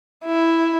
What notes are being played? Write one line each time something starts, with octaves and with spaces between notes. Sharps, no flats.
E4